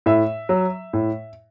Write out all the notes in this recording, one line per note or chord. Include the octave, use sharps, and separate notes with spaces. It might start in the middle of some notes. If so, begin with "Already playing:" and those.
A2 E5
F#3
A2